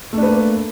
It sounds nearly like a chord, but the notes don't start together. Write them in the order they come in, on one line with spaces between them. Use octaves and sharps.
A3 D4 B4 A#3